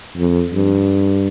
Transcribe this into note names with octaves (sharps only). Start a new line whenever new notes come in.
F2
G2